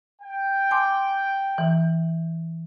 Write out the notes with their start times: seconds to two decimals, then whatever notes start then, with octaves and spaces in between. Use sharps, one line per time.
0.22 G5
0.71 G#5 C6 D6
1.58 E3